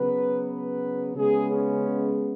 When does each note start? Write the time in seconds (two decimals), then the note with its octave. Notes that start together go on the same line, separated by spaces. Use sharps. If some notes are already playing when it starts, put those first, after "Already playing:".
Already playing: C#3 F#3 B3 B4
0.46 B4
1.15 C#3 G#3 B3 G#4
1.50 C#4